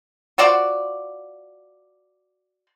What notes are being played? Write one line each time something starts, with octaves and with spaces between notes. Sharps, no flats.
F4 F#4 C5 D5